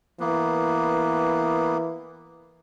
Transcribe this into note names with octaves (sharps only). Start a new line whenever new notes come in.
E3 A#3 B3